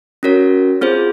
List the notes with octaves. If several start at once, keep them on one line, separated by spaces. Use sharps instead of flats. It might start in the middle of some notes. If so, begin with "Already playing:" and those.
C#4 F#4 A#4 C#5
C4 F4 G#4 C5